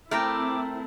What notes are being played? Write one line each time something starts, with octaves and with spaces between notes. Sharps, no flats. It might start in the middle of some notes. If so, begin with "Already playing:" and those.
A3 C4 E4 A#4 G5 A#5 D6